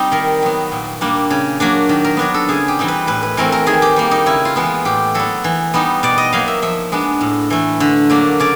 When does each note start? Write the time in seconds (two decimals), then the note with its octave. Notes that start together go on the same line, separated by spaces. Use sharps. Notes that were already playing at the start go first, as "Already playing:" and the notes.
Already playing: G3 C4 D#4
0.12 D#3 A#4
0.42 F#3 B3
0.72 A#2
1.01 G3 A#3 D4
1.30 C#3
1.60 F#3 A#3 D4
1.89 D#3
2.05 A#4
2.17 F#3 B3 D4 A#4
2.34 A4
2.49 C#3 G#4
2.68 G4
2.79 E3 G3 C4 D#4
2.88 B4
3.07 A2 B4
3.23 B4
3.37 E3 A3 C4 A#4
3.52 A#4
3.66 D#3 G#4
3.82 G4
3.96 G3 A#3
4.11 D#4
4.26 C#3 E4
4.45 F4
4.56 E3 G#3 B3
4.65 F4
4.85 A2 G4
5.15 F#3 B3 A4
5.44 E3
5.74 G3 B3 D#4
6.03 B2 D5
6.18 D#5
6.32 F#3 A#3 D#4 F5
6.48 E5
6.62 F3 E5
6.92 G#3 B3 D4
7.21 A2
7.50 E3 A3
7.80 D3
8.10 F#3 A#3 D4
8.40 C#3 D5